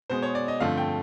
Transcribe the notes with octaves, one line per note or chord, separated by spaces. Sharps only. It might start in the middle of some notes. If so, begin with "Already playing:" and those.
B2 G#3 B3 C5
C#5
D5
D#5
G2 D3 F3 A3 C4 F5
G5